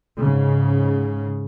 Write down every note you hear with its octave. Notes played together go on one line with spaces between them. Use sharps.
G#2 C#3